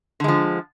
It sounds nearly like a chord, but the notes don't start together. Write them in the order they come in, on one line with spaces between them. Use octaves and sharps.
D3 G#3 F3